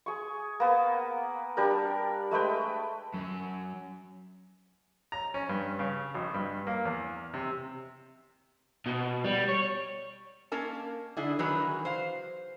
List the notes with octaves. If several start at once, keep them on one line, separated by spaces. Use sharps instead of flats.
G#4 C#6
A#3 B3
G3 D4 G4 A#4
G#3 A3 B4 G5
F#2
A#5
C#4
G2
C#3
G#1
G2
A#3
E2
C3
B2
G3
C#5
A#3 C#4 A#4 A5
D3 E4 G#4
D#3 E3 F#3 G#4 B4
C5 F5